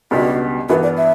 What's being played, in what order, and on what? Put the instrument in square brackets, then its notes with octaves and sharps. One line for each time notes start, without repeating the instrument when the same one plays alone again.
[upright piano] C#2 B2 G3 D4 G4 [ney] F#4
[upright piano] G2 E3 B3 [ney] F#4
[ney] D5
E5